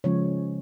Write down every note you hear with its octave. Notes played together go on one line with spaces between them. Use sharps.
C#3 F3 G#3 C#4 C#5